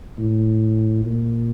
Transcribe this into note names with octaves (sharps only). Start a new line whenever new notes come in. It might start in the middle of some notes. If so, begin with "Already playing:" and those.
A2
A#2